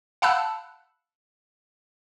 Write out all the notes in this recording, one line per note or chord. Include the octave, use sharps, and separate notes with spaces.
F5 F#5 A5 B5 E6 F#6